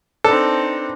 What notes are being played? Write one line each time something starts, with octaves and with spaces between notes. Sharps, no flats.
C4 D4 D#4 A4 B4